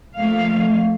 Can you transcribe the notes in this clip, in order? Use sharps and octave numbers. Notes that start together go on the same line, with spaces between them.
F3 A3 A#3 F5